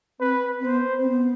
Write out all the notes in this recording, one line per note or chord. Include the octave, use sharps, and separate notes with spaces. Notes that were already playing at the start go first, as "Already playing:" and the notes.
C4 B4
C4
B3 C5
C4
B3